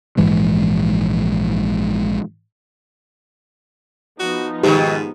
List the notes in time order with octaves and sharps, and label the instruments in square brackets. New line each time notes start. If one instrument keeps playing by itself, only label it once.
[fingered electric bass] A#1 G#2 E3 G#3
[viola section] F3 B3 D#4 [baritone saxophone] F#4
[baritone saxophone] G#2 [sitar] B2 D#3 [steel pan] G4